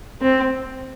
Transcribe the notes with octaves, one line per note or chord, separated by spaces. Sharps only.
C4